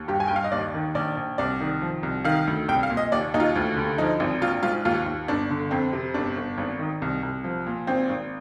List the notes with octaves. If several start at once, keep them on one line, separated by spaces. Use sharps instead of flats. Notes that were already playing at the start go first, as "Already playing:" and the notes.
Already playing: D#2
G2 G4
G#5
G5
G2
F5
D#5
D#2 D5
D#3
A#1 D5
A#1
C2 D5
D#3
F3
C2
D#3 F5
D2
C2 G5
F5
A#2
D#5
D#2 D5
D#2 D#4
F4
D2
D3
F3 D#4
G#1
A#1 F4
G#2 F4
D#2 F4
D#2
G1 D4
D3
F2 C4
C3
G1 D4
G1
G#1
D#3
C2
C2
F3
A#2
G#1 C4
G#1